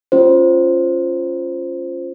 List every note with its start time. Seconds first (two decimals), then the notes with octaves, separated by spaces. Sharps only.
0.12 C#4 F4 C5